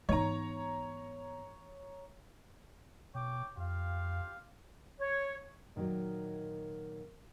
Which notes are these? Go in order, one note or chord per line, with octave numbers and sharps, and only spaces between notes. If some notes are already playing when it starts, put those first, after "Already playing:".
G#2 E3 B3 D#4 C#5 A#5
B2 C#5 G5 D6
F2 F4 G4 F5
C#5
A#2 D#3 F#3 A3 A#3